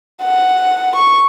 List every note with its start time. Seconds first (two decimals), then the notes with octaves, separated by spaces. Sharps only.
0.22 F#5
0.96 C#6